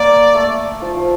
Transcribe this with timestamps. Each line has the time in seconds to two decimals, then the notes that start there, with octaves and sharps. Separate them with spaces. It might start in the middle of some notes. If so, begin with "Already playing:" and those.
Already playing: A#3 D5
0.35 A3
0.82 F3
0.97 F3